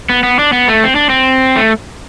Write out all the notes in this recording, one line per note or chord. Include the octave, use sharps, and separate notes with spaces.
B3
B3
D4
B3
A3
C4
D4
C4
A3